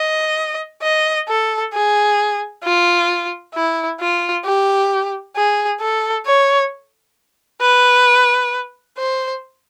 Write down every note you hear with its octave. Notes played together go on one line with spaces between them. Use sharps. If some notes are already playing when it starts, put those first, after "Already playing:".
Already playing: D#5
D#5
A4
G#4
F4
E4
F4
G4
G#4
A4
C#5
B4
C5